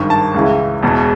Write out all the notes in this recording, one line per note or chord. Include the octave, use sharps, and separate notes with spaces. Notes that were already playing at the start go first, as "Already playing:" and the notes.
Already playing: G#1 G2 D#3
A5
C#2 C#3 E3
E1 E2 B2